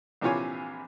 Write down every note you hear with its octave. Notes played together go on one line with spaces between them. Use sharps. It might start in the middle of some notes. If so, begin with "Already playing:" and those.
A#1 C3 E3 F4 C#5 G#5